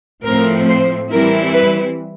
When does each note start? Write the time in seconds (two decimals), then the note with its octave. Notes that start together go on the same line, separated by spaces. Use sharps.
0.24 A2 F3 A3 C4 A#4
0.68 C5
1.10 E3 G3 C4 E4 A#4
1.54 B4